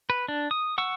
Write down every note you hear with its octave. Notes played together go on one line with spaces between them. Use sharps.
B4
D4
D#6
F#5 C#6 E6